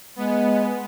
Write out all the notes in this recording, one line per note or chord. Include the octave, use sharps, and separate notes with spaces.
G#3 B3